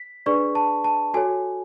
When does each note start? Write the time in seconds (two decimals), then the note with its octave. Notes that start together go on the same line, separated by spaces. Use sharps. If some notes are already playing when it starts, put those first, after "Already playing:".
Already playing: B6
0.26 D4 G#4 B4 D5 C#6
0.55 A5
0.84 A5
1.14 F#4 A4 C#5 G#5